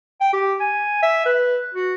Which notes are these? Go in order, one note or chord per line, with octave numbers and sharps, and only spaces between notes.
G5
G4
G#5
E5
B4
F#4